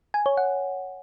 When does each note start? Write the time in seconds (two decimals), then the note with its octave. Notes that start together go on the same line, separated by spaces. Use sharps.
0.14 G#5
0.26 C#5
0.37 F#5